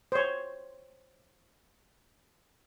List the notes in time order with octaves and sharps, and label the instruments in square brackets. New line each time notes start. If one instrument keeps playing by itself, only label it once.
[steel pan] C5 C#5